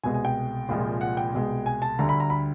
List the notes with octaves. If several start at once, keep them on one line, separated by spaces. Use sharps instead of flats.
C2 B2 G#3 G#5
G#5
G5
C2 A#2 F3 G#3
F#5
G5
C2 B2 G#3
G#5
A5
D2 D3 G3 A#5
B5
A#5
B5